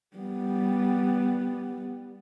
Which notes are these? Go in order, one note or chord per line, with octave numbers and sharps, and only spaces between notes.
G3 B3